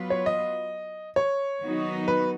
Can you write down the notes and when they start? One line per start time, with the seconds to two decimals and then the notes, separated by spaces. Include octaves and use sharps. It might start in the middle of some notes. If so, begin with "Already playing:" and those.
Already playing: F#3 B3 F4 B4
0.10 C#5
0.26 D#5
1.16 C#5
1.62 D#3 F#3 B3 D#4 F#4
2.08 B4